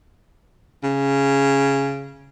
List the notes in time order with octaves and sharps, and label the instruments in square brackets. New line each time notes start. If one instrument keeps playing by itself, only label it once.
[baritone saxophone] C#3